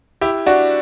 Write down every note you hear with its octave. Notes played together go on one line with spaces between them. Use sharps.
E4 G4
D4 F#4